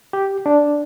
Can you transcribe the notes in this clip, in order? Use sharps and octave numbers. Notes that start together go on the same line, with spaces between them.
G4
D4